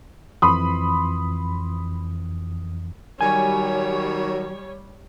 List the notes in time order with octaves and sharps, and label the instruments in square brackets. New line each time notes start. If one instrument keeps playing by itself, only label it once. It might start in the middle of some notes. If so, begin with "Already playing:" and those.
[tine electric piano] F2 E3 [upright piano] B5 C6 D#6
[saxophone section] D#3 F#3 [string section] G3 C#5 [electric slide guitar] G#5